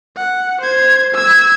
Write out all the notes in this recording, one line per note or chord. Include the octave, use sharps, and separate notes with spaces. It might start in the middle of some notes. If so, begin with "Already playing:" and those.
F#5
C5 G#6
E6 G#6